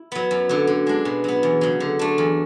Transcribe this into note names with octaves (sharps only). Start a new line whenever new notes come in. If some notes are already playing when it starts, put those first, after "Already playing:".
Already playing: E4
F#3 B3
F#2
D3 F#3
D3
G#3 D4
B2
F#3 B3
E2
C#3 F#3
D3
A3 D4
E2